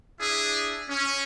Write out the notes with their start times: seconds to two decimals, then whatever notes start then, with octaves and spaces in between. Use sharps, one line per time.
0.20 D4 E4 G#4
0.88 C#4